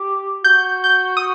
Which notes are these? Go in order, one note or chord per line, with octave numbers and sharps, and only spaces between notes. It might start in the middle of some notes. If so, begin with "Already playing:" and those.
Already playing: G4
F#4 G6
G6
D#6